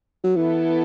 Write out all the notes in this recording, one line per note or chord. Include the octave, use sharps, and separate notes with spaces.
F#3
E3 B3 E4 A4